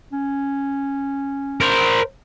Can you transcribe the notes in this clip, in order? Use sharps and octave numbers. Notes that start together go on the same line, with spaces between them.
C#4
A#4 C5